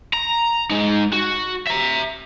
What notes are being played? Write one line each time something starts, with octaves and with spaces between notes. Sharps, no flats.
A#5
G#3 D#4
F#4
E5 A#5